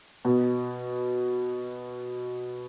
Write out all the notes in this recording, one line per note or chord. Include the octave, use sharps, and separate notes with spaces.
B2